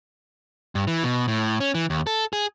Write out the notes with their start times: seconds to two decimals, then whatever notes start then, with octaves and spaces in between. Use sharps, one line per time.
0.75 G2
0.87 E3
1.04 B2
1.28 A2
1.60 C#4
1.74 E3
1.90 D#2
2.07 A4
2.33 G#4